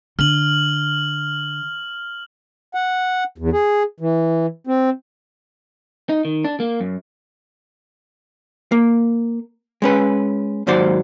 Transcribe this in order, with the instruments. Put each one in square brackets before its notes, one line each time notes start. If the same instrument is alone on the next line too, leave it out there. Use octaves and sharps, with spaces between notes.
[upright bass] D3 [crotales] F6 F#7
[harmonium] F#5
E2
G#4
E3
C4
[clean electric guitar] D#4
D#3
D4
A#3
F#2
[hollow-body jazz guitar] A#3
G#3 C#4 B4
D#2 G#2 F#3 C5 D5